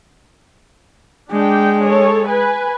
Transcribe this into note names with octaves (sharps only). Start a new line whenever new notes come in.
G#3 D4 G5
A4 C#5
B4 G#5